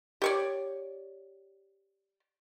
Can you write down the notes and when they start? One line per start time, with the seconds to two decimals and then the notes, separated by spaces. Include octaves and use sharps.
0.22 G4 C#5 D5